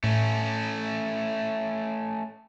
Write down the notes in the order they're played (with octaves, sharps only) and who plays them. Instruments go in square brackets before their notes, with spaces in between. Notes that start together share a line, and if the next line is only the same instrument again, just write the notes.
[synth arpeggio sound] A2 [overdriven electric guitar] A3 C#4